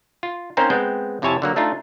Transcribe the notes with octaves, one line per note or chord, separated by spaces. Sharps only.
F4
A#3 C4 C#4 D#4 A#4 C5
G#3 B3 C4 G5
F2 C3 E4 C#5 G#5 A5
D3 F#3 A#3
A3 D4 D#4 F4